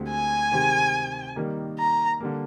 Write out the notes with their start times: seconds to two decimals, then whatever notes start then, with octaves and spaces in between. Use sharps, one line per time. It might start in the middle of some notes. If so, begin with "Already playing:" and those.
Already playing: D2 D3 G#3 C4 G4
0.09 G#5
0.52 C3 D#3 G#3 C4 G4
1.36 D#3 G3 A#3 D#4
1.79 A#5
2.20 D3 G3 A#3